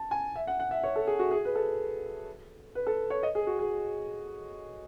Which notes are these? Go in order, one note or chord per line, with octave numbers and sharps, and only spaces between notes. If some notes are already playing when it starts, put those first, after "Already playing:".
Already playing: A5
G#5
E5
F#5
F#5
E5
C#5
A4
G#4
F#4
G#4
B4
A4
B4
A4
C#5
D#5
G#4
F#4
G#4